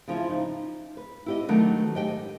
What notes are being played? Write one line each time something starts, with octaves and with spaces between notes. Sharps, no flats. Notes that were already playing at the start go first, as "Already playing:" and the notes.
C#3 F3 C#4 E4
D#4
B4
E4 G4 D#5
D#3 F#3 A3 B3 D4
G4 D#5 G5 G#5